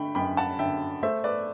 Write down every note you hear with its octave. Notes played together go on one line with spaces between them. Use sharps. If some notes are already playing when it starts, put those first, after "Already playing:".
Already playing: D3 A3 G5 B5
F#2 G5 B5
F#5 A5
D3 E5 G5
A3 C5 E5
B4 D5